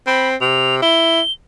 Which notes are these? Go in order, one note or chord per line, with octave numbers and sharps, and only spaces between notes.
C4 B5
C3 F7
E4 G7